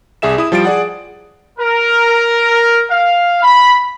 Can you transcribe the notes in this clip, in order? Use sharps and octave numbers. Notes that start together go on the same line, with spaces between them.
C2 G#4 E5 E7
E4 D#6
F3 G3 F4 A6 D7
G#4 D5 F#5
A#4
F5
B5